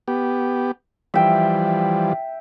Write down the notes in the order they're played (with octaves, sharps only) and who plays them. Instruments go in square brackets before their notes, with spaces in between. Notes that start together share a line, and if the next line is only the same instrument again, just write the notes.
[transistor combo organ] B3 G4
[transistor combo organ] E3 F3 G3 [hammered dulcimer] E5 G5